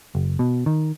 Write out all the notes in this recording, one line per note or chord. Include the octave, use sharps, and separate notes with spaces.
F#1
B2
D#3